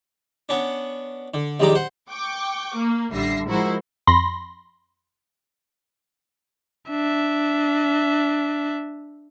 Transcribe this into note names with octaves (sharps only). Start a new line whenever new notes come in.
B3 C#4 D4
D3
A#1 D#2 G3 G#3 A#5 D6
C5 F#5
G5 C#6 D6
A#3
A1 D3 G3 E5 A#6 C7
F3 G#3 E4 F#4 A#4 C5
F2 B5 C6 A#6
D4 E5